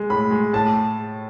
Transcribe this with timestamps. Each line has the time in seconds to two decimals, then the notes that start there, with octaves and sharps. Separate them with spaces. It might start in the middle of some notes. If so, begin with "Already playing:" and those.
Already playing: G#3
0.10 A2 B5
0.31 G#3
0.53 A2 A5